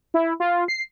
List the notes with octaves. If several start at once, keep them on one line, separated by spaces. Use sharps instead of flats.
E4
F4
C7